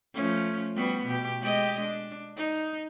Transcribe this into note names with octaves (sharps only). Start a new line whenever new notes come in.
F3 A3 C#4
G3 B3 F#4
B2 G4
G#3 G4 D#5
D4
D#4